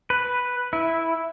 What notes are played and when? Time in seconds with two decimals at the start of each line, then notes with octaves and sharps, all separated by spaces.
0.10 B4
0.73 E4